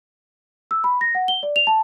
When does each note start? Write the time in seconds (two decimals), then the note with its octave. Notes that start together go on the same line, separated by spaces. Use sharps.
0.71 E6
0.84 B5
1.01 A#6
1.15 F#5
1.28 G7
1.43 D5
1.56 F7
1.67 A5